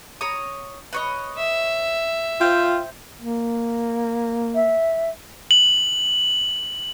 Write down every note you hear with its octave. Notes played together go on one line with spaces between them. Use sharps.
C#5 A#5 D#6
B4 C#5 D#5
E5
F4 C5 G5
A#3
E5
F#7